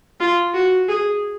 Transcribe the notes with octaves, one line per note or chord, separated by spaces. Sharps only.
F4
F#4
G#4